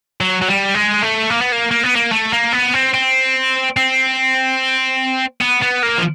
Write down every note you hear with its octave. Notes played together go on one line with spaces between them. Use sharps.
F#3
F#3
G3
G#3
A3
A#3
B3
A#3
A#3
B3
A#3
A3
A#3
B3
C4
C4
C4
B3
B3
A#3
F3